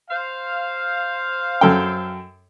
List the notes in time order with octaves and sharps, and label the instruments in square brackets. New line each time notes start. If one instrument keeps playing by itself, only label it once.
[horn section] C5 F5
[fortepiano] F#2 A4 G5